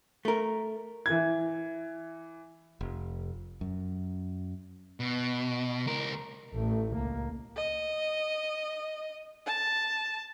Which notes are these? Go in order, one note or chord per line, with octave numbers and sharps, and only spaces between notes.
A3 A#4
E3 G#6
F1
F#2
B2
C#2 A#4
A1 A3
C#2 A#3
D#5
A5